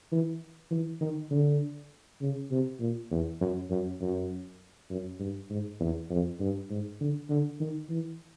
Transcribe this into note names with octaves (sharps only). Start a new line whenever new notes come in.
E3
E3
D#3
D3
C#3
C3
A#2
E2
F#2
F#2
F#2
F#2
G2
G#2
E2
F2
G2
G#2
D3
D3
D#3
E3